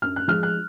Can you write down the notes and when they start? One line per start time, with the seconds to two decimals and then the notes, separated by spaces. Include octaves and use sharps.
0.02 F#2 F6
0.16 F#6
0.28 F3 G#3 F6
0.43 F#6